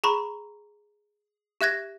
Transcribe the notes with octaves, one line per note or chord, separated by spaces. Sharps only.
G#4 A#5 B5 C#6
G4 E5 F#6 G#6 A#6